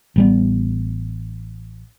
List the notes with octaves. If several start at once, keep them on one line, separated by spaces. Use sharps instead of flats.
A1 G3 B3